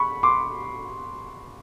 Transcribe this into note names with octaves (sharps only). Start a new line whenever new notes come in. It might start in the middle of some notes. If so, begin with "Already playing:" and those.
Already playing: B5 C#6
C6 D6